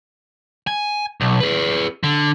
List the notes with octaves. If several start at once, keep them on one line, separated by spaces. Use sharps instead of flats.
G#5
B1
G#4 B4
D3